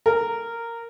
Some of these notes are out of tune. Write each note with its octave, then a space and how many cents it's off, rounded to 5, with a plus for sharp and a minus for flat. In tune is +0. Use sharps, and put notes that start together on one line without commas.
A#4 -10